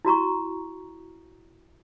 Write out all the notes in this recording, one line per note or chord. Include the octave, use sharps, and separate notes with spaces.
E4 F#4 A#5 C#6